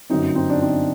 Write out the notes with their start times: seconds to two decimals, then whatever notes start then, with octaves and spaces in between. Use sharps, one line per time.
0.10 G1 F#2 F#3 C4 D#4
0.35 C4 D#4
0.50 D4
0.60 C4 D#4